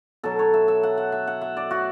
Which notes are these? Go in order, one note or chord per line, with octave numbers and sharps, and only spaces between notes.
B2 F#3 A4
C#5
E5
E5
F#5
F#5
E5
F#5
E5
D5
F#4